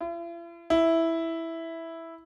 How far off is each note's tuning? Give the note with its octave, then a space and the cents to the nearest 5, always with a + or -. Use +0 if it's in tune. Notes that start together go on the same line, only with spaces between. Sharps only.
E4 +45
E4 -5